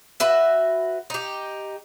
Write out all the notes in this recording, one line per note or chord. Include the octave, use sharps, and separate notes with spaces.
F#4 B4 E5
D#4 G4